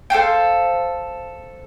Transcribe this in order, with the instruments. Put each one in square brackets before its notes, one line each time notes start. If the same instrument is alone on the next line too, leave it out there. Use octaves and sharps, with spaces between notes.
[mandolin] A4 C5 F5 G5